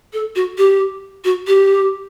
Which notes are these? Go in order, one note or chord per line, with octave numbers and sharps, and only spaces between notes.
A4
F#4
G4
F#4
G4